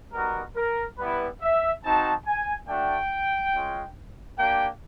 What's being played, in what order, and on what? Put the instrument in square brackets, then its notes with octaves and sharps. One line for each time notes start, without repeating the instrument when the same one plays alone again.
[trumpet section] G3 B3 D#4 F#4 A#4
A#4
G3 B3 E4 B4
E5
C4 D#4 F#4 A5
G#5
A3 D4 F#4 G5
G#3 C#4 F4
A#3 D4 G4 G5